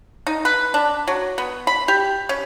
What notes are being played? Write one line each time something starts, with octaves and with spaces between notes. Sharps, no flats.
D#4
B4
D4
F#3
B3
B5
G4
C#4